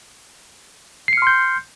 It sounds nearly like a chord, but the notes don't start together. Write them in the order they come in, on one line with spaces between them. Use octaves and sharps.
C7 C#7 F6 C6 G6